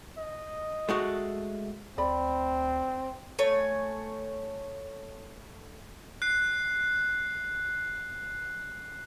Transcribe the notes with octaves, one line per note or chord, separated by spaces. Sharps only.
D#5
G#3 A3 F#4
D2 C4 D5 B5
A3 C#5 G#5
F#6 C7